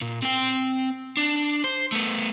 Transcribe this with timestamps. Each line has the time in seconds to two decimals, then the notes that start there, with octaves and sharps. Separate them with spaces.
0.01 A#2
0.22 C4 G5
1.17 D4
1.64 C5
1.92 A3 B3